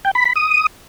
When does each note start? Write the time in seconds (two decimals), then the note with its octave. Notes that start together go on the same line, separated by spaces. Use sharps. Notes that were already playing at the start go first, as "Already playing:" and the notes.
0.05 G5
0.15 B5
0.25 B5
0.36 D#6